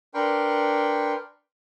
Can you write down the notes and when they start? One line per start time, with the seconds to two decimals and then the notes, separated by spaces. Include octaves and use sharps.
0.14 D4 A#4 B4 G5 C6 C#6